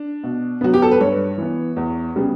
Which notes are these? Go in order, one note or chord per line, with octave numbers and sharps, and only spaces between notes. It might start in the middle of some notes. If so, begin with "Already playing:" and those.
Already playing: D4
B2
F#3 B3 F#4
G4
A4
B4
G2 C#5
E3 B3
E2
C#3 G3 B3